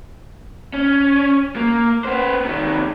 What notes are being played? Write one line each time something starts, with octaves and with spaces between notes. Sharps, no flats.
C#4
A#3
B3 C5
C3 D#3